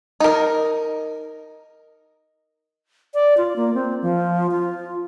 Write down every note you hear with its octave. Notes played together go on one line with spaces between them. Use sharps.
D#4 A#4
D5
F4
A#3
C4
F3
F4